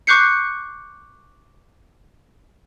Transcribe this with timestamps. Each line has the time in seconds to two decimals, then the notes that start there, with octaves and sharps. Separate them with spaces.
0.07 C#6 D6 F#6 G6 C7 C#7